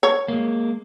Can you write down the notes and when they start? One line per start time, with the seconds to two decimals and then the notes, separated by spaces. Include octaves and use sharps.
0.03 C#5
0.28 G#3 A#3